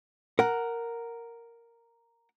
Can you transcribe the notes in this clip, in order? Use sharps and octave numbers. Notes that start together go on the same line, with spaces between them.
A#4 F#5